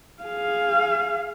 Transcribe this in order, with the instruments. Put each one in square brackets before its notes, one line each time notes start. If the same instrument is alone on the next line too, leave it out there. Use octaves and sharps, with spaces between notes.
[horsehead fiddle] G#4 F5